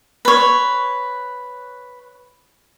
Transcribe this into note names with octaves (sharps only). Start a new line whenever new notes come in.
B4 C#5